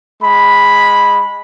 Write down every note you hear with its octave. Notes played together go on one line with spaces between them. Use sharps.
G#3 B5